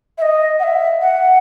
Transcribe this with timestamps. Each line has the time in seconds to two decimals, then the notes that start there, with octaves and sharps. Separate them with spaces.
0.18 E5
0.21 D#5
0.59 F#5
0.63 E5
1.01 F#5